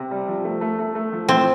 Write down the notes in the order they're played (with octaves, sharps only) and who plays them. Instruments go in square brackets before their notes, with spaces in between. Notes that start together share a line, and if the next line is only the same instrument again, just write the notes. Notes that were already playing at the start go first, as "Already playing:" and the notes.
Already playing: [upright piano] C3
G3
F3
A3
A3
A3
A3
F3
[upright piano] A2 [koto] C4